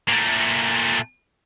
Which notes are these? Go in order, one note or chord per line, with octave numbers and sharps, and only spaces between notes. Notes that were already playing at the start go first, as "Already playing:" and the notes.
A#2 A3